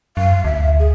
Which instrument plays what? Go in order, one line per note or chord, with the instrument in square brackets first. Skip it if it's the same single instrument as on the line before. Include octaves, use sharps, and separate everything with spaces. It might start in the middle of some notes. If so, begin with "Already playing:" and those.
[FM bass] F#2 [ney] F5
[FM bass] D2 [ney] E5
[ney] G#4